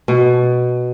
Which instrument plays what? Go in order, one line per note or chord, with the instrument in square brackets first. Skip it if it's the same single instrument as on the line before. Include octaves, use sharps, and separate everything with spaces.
[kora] B2